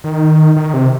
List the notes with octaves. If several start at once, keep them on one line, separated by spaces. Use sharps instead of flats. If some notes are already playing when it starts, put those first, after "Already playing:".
D#3
D#3
C3